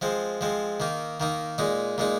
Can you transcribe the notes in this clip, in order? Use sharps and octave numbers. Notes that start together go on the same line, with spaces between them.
F3 G#3 C4
F3 G#3 C4
D#3 A#3 D#4
D#3 A#3 D#4
A#2 G#3 D#4
A#2 G#3 D#4